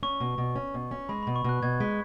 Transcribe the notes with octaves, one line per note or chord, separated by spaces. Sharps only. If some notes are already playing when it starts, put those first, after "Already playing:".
C#4 C#6
B2
B2
C#4
B2
C#4
G#3 B5
B5
B2
C#6
B2 F#6
B2 G#6
G#3 B6